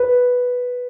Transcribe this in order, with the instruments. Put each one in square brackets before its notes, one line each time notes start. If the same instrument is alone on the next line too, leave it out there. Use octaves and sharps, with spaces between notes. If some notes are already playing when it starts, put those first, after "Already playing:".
Already playing: [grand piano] B4